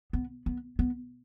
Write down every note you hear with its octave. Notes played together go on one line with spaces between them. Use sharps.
B3
B3
B3